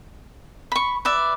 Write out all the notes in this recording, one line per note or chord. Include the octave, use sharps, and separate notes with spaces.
B5 C#6
B4 D5 E5